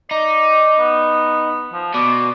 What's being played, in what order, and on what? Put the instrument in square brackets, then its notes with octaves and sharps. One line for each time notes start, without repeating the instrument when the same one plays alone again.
[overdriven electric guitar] D#4 [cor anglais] D5
[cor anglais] B3
F3
[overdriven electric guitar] B2 [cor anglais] D5